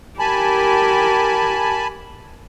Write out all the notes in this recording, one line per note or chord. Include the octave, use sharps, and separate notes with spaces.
G4 A#4 G#5 A5 B5